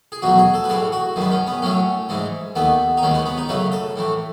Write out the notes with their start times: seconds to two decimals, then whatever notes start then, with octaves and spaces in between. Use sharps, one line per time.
0.12 G#4
0.22 E2 B2 F#3 A3 F#4
0.38 G#4
0.54 A4
0.64 B4
0.69 A2 E3 G#3 A4
0.92 F#4
1.16 F#2 D#3 G#3 B3
1.32 C#4
1.47 B3
1.62 A2 F#3 A3 C#4
2.09 G#2 E3 G#3
2.56 D#2 D#3 A3 B3
2.97 D#4
3.02 D#2 D#3 G#3 C#4
3.14 B3
3.26 B3
3.38 D#4
3.48 F#2 C#3 F#3 A3 B4
3.72 A4
3.96 A2 E3 A3